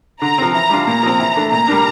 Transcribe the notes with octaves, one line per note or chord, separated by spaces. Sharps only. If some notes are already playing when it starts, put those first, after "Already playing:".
D3 A#5
F3 C4
E3 A#5
G3 D4 F4
A#2 A#5
F3 C4
E3
A3 D4
A#2 A#5
G3 A#3 D4